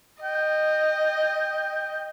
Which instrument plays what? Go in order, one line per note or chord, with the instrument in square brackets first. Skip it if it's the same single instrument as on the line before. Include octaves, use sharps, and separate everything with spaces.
[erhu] D#5 [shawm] G5